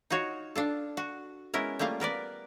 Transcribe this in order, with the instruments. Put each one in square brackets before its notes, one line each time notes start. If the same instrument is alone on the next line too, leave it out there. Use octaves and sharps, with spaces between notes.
[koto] D#4 F4 F#4 C#5
D4 F4 A4
F#4
G#3 B3 C#4 E4 A#4
G3 A3 A#3 F4 F5
B3 A#4 B4 D5